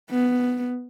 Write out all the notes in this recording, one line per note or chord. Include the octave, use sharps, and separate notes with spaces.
B3